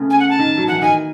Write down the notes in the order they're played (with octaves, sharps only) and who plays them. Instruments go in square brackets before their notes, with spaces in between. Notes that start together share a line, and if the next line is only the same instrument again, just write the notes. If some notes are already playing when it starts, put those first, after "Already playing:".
Already playing: [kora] C#3 A3 B3
[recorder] G#5
F#5
A5
[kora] D#3
F#3
[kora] E3 [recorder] F#5
[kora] D#3 [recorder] G#5